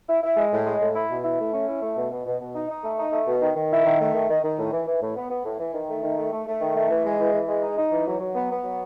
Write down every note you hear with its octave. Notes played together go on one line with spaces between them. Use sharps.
E4
E4
G#3
A2
G#3
A2
E4
B2
E4
A3
C#4
E4
A3
B2
B2
B2
B2
D#4
D#4
A3
D#4
A3
B2
D#3
D#3
E4
D#3
A3
D#3
D#3
D#3
A2
E3
E3
A2
B3
B3
A2
E3
D#3
A3
D#3
A3
A3
A3
D#3
A3
E3
G#3
E3
E3
G#3
D#4
D#4
E3
F#3
F#3
B3
B3
F#3